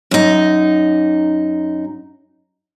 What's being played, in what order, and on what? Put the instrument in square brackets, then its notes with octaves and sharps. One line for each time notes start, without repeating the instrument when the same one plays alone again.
[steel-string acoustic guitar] F#2 D#4